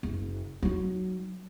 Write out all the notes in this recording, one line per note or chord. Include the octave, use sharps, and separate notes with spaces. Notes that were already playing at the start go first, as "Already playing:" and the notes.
F#1
F#3 D#4